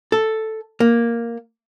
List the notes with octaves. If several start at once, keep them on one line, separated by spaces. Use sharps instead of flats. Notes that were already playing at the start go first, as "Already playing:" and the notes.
A4
A#3